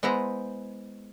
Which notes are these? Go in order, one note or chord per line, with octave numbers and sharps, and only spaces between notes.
G#3 B3 E4 C5 A#5